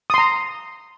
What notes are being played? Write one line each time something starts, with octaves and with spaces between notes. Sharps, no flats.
A#5 C6 D#6